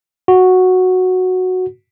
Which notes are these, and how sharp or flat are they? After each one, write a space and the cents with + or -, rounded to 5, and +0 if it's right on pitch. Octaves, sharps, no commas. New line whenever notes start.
F#4 -5